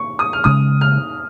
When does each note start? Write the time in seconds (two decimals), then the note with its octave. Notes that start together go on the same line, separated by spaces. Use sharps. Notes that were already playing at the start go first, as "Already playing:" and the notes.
Already playing: C#6
0.19 D#6
0.33 F6
0.44 C#3 G#3 C#4 D#6
0.81 F6